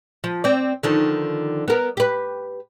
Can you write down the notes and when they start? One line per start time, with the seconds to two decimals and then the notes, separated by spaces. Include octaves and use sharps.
0.24 F3
0.44 C4 D5
0.83 D3 D#3 F3
1.68 B3 A#4
1.97 G4 B4